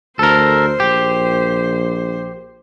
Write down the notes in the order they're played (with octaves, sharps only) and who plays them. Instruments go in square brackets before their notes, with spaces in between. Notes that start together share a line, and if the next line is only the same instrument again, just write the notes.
[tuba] D2 [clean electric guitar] A4 A#4 [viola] C5
[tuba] A#1 [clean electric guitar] G4